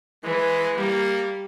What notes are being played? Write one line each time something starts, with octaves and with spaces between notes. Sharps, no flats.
E3 G#3
G3 A#3